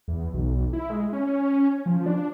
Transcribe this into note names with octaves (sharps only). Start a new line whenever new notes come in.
E2
B1
E4
G#3
C#4
F3
D4